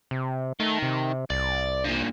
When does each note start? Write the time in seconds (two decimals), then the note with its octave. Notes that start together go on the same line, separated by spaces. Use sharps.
0.11 C3
0.60 D#3 A3
0.82 C3
1.30 C2 D5
1.85 G2 A#2